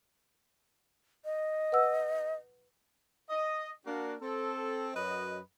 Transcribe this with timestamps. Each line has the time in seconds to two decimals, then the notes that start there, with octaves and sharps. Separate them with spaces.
1.25 D#5
1.72 B4 F#5 E6
3.29 D#5
3.86 A#3 D4 F#4
4.21 C4 A4
4.94 F#2 F#3 B4 D#5